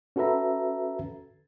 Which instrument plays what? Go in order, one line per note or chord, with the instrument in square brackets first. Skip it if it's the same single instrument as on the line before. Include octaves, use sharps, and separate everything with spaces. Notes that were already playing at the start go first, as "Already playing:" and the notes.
[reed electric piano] C#4 F#4 A4 B4 E5 A#5